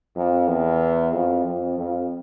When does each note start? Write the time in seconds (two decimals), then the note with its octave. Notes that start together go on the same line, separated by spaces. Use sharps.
0.15 F2
0.47 E2
1.14 F2
1.46 F2
1.78 F2